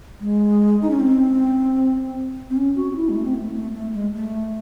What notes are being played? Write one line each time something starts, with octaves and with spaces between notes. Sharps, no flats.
G#3
D#4
C#4
C4
C4
C#4
F#4
F#4
E4
G#3
A3
C4
A3
A3
A3
G#3
A3